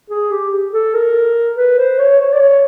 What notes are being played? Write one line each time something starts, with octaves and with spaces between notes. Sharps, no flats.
G#4
G4
A4
A#4
B4
C5
C#5
C#5
D5
C#5